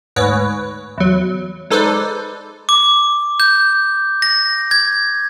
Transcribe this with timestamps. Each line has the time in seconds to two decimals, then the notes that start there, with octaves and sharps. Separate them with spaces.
0.16 D2 G#2 B4 C#5
0.98 E2 F#3
1.70 G#3 D#4 A4 B4 C5 D5
2.69 D6
3.40 G6
4.22 A#6
4.71 G#6